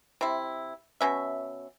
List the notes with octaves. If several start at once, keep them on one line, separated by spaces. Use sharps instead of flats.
C3 E4
B2 C#4 E5